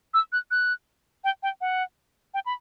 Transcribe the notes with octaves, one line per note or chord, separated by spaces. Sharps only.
E6
F#6
F#6
G5
G5
F#5
G5
B5